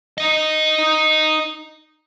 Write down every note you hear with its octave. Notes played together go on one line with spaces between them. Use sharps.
D#4 D#5